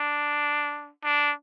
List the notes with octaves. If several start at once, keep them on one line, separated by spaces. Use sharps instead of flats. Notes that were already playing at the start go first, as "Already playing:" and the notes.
Already playing: D4
D4